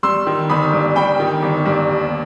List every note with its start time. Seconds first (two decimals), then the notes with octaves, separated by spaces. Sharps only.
0.03 G3 C6 E6
0.27 D#3
0.50 G1 B5 D#6
0.73 G2
0.96 G3 G5 B5
1.20 D#3
1.43 G1
1.66 G2
1.89 D#2